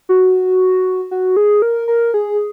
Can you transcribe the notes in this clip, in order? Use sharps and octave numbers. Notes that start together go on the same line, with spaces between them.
F#4
F#4
G#4
A#4
A#4
G#4